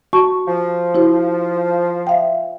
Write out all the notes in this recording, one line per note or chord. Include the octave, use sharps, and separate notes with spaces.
F#4 A5 C#6
F3
E4 F#4 C5
E5 F5 G5